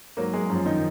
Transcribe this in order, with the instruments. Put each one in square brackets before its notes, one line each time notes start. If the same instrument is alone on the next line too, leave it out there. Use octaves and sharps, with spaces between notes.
[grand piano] G#2 F#3 A#3 A#4
G#3 G#4
F#2 F3 C#4
D#3 D#4